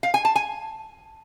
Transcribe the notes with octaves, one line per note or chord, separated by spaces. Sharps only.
F5
G#5
A5
G#5